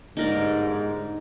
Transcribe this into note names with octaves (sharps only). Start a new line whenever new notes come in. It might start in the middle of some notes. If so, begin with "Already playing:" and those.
G1 G#2 D#4 A#4 D5